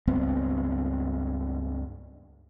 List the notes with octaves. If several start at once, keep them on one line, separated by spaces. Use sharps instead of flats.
C#2 G2 B3 C4